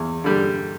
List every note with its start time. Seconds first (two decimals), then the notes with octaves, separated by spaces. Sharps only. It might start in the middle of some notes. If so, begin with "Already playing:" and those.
Already playing: E2
0.24 D3 G3